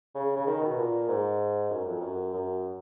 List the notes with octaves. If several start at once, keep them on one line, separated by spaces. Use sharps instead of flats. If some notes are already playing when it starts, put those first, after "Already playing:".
C#3
C#3
D#3
B2
A#2
G#2
F#2
F2
F#2
F#2